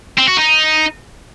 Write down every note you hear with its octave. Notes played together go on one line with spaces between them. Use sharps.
C4
F#4
D#4